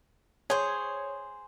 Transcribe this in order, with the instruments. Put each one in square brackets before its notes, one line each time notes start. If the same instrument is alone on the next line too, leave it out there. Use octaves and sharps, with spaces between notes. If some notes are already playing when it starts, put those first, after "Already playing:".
[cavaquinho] G#4 C5 [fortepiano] C#5